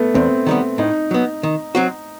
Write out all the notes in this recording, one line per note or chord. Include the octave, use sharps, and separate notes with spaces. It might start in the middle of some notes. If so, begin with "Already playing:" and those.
Already playing: A3 B3
E2 C4
D#3 G3 B3
A2 D#4
F#3 B3
D#3
F#3 C4 F#4